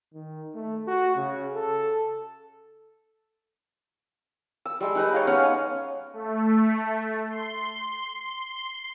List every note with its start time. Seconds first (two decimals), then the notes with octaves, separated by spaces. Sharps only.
0.14 D#3
0.55 A3
0.87 F#4
1.16 C#3
1.54 A4
4.65 E6
4.80 G3 G#3
4.95 D#4 B4 D#5
5.13 C#5 D#5 F5
5.27 B3 C#4 C#5
6.13 A3
7.30 C6